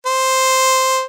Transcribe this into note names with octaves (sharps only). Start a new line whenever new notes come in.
C5